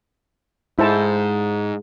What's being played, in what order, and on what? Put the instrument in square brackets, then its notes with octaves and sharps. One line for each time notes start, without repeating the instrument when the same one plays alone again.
[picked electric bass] G#2 [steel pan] E4 C5 A5